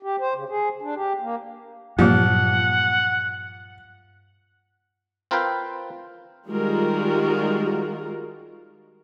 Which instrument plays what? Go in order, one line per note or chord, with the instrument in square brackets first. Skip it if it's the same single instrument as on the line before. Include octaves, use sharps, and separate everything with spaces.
[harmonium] G4
C5
C#3
G#4
D4
G4
A#3
[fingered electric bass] G2 A#2 [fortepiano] F3 [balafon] F#3 A#3 G4 [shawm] F#5
[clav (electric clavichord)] C4 F4 A#4 B4 F5 G5
[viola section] D#3 G3 G#3 F4 F#4 A#4